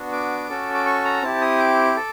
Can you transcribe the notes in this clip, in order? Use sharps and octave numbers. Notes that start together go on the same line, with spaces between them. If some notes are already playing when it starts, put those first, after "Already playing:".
Already playing: B3 D4 F#4
D6
C#4 F#4 A4
D6
C#6
A#5
C4 E4 G4 A5
D#6
D6
A4